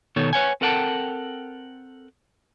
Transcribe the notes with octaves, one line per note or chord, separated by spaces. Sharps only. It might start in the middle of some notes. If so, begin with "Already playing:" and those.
B2 D#3 B3 D#4 A4 C#5
B4 C#5 F#5 G#5
C4 A4 A#4 F#5 G5 A5